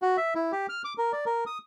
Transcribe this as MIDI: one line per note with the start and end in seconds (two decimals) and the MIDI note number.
0.02 0.17 66
0.17 0.34 76
0.35 0.52 64
0.52 0.67 67
0.69 0.82 89
0.84 0.94 86
0.98 1.12 70
1.12 1.25 74
1.26 1.44 70
1.46 1.58 87